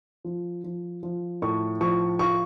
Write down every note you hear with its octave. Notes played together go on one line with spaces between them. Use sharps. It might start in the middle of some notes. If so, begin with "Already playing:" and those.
F3
F3
F3
A2 C#6
F3 C#6
F4 C#6